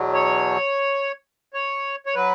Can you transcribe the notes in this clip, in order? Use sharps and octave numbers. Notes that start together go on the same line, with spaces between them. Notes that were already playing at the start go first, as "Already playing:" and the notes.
Already playing: E2 B2 F#3
C#5
C#5
C#5
F#3 B4